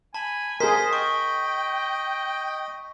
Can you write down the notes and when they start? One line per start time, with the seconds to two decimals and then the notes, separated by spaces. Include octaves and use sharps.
0.15 G#5 A5 B5
0.60 G#4 A#4 C5 D#5 B6
0.93 D#5 G5 C#6